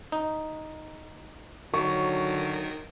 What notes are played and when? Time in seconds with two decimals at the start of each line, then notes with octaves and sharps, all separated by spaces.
0.12 D#4
1.74 D3 D#3 F#3 C#6